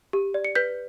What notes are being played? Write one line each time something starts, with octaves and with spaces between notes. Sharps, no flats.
G4
D5
C#7
B4 G6 B6